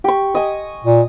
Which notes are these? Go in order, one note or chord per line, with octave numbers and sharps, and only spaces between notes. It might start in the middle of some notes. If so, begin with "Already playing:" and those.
G4 C#6
D#5 G#5
A#2